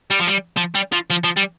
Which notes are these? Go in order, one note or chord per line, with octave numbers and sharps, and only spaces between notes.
G3
F3
G3
F3
G3
F3
F3
F3
G3